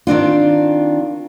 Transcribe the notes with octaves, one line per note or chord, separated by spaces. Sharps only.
D#3 C4 D4 F4